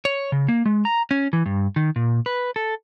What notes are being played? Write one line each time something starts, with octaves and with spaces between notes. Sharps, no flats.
C#5
C#3
A#3
G#3
A#5
C#4
E3
G2
D#3
A#2
B4
A4